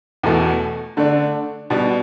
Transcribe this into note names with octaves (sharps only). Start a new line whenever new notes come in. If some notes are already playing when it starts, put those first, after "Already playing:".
E2 B2 A3
D3 A3 D4
B2 G3 D4